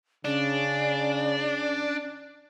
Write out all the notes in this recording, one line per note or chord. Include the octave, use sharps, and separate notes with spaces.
C#3 C#4 D4